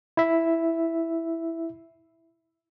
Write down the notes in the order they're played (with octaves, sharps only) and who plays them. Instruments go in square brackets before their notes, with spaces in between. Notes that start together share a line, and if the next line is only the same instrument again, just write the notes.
[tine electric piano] E4 E5